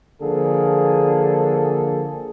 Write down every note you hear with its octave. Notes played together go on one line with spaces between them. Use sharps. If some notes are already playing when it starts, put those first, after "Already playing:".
D3 F3 A#3 G#4 A4